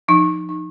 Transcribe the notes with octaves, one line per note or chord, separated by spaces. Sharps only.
F3 D#4
D#4